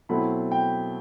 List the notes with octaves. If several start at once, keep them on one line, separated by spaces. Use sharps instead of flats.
B2 F#3 A3 C4 E4 B5
G5